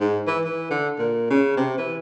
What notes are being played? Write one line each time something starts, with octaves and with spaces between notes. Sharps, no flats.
G#2
E3
E3
D3
A#2
C#3
C3
E3